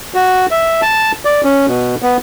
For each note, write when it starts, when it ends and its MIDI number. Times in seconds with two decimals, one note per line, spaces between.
0.14 0.46 66
0.51 0.81 76
0.82 1.12 81
1.25 1.41 74
1.44 1.66 61
1.67 1.95 47
2.02 2.17 59